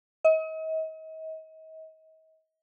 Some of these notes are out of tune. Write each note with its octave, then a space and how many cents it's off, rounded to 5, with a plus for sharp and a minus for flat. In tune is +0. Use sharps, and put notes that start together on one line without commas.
D#5 +40